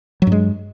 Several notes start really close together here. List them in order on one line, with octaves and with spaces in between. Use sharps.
F#3 G2 G#3